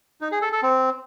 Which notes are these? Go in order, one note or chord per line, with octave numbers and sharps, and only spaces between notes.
D#4
G#4
A4
A4
C4